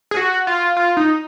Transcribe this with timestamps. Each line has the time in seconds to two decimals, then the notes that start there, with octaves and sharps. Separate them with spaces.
0.11 G#4
0.17 F#4
0.47 F4
0.77 F4
0.97 D#4